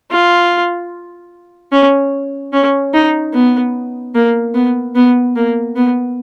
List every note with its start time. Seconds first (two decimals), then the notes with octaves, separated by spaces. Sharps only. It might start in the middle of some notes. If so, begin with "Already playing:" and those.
0.11 F4
1.72 C#4
2.53 C#4
2.94 D#4
3.34 B3
4.15 A#3
4.55 B3
4.96 B3
5.36 A#3
5.76 B3